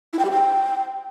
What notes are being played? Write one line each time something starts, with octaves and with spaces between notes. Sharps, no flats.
E4
G5
G4
G5